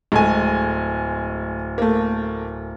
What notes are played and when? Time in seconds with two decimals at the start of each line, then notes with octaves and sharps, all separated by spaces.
0.12 D1 G#3 A3 G#5
1.78 A3 A#3